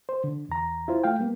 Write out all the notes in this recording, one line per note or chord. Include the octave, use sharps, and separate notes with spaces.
C5
D3
E2 A#5
E4 F4 C5
A3 F5 G5
G3 A#3 B3